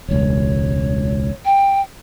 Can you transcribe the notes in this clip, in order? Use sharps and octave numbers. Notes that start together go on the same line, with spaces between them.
E1 C#2 C#5
G5